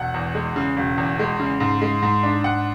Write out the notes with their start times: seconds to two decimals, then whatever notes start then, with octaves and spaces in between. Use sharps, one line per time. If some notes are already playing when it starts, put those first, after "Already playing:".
Already playing: E1 F#5
0.14 E2
0.35 G#3
0.56 C#3
0.77 E1
0.98 E2
1.19 G#3
1.40 C#3
1.60 G#2
1.82 G#3
2.03 G#2
2.23 D4
2.44 G#2 F#5